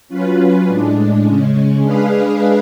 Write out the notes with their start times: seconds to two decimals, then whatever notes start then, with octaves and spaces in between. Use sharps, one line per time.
0.08 F#3 C#4 F4 B4
0.66 A2 G#3 D4
1.23 C#3 G#3 C#4
1.81 G#3 D4 G#4 B4 F5